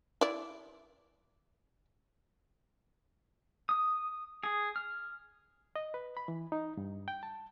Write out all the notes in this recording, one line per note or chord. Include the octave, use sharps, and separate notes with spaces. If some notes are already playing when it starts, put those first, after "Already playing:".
E4 D5
D#6
G#4
F6
D#5
B4
B5
E3
D#4
G2
G5
A5